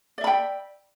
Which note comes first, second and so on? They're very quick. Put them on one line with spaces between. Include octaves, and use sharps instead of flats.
D5 E5 B5 G5